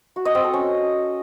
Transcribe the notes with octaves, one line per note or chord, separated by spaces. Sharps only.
F#4
D#5
C4
A4
C#4